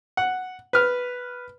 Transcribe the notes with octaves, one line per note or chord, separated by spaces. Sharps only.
F#5
B4 F6